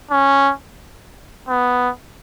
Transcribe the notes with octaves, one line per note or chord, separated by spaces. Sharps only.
C#4
B3